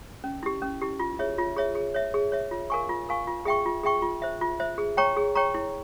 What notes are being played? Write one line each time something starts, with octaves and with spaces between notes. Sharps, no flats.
C#4
E4 G4
C#4
E4 G4
F4
G#4 C#5 E5
F4
G#4 C#5 E5
G#4
C#5 E5
G#4
C#5 E5
F4
A#4 F5 G#5 C#6
F4
A#4 F5 G#5 C#6
F4
G#4 E5 G5 C#6
F4
G#4 E5 G5 C#6
F4
C5 E5
F4
C5 E5
G#4
C#5 G5 A#5 C#6
G#4
C#5 G5 A#5 C#6
E4